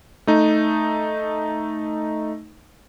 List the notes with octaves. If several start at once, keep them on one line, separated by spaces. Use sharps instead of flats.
A3 D#4